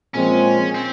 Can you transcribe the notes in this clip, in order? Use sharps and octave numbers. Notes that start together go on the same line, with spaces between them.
A#2 F3 G#3 C4 C#4
C4